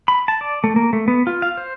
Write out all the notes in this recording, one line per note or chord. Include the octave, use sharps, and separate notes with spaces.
B5
A5
D5
A3
A#3
A3
B3
F4
F5
C5